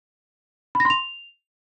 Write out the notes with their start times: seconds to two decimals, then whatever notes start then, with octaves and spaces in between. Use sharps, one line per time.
0.75 B5
0.80 A#6
0.85 C6
0.90 F7